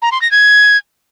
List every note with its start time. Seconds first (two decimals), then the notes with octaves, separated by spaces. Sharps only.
0.02 A#5
0.12 C6
0.22 A#6
0.31 G#6